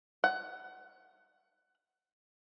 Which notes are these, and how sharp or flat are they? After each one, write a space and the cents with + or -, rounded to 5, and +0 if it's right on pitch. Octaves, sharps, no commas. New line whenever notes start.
F#5 +20